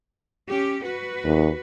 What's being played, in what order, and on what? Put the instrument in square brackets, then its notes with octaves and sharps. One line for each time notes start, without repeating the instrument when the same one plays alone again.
[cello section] C#4 G4
F#4 B4
[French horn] D#2